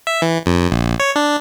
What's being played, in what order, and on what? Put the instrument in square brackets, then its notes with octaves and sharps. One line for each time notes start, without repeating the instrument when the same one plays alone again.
[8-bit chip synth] E5
E3
F2
A#1
C#5
D4